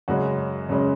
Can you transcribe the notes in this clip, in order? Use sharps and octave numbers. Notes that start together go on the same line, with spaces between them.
F#2 C#3 G#3 F#4
F#2 C#3 G#3